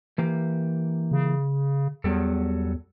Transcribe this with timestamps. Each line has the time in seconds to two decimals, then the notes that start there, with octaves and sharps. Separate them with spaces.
0.18 E3 A#3 G4
1.12 C#3
2.04 E2 F#3 G3 A4